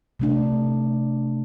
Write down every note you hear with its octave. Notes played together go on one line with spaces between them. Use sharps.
C3 A3 D4